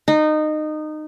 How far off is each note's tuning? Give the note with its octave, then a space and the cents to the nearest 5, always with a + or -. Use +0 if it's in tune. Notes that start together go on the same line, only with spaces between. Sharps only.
D#4 -20